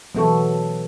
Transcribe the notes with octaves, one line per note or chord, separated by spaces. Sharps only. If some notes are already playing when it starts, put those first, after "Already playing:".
B2 E3 F#3 B3 A4 C#6